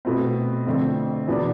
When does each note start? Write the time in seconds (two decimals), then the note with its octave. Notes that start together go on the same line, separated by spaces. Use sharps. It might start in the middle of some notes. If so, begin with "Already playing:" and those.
0.05 B2 A3 C4
0.67 F2 D3 A3 C4
1.28 E2 B2 B3 D4